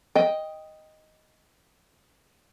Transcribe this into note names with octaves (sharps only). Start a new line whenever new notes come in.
D#5 G5